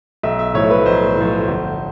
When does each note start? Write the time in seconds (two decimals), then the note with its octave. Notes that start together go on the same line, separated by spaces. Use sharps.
0.23 B1 E5
0.39 E5
0.54 A2 F3 C#5
0.70 B4
0.86 B1 C5
1.16 A2 F3
1.48 G1